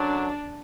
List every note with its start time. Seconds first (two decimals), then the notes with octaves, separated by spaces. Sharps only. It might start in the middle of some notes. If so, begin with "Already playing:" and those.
Already playing: F#2 D3 F#3 D4